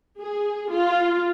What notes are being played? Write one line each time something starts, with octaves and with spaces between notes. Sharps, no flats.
G#4
F4